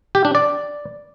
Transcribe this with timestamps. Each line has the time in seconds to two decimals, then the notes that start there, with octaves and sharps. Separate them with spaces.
0.15 G4
0.25 D4
0.35 D5